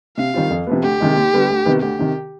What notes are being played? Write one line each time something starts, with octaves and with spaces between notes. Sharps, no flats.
C3 F5
D#3 G3 C4 F4
F2
C3 F3 B3
D2 G4
C3 D#3 G#3
D#2
D3 G3 B3
D2
C3 D#3 B3
D2 G4
C3 D#3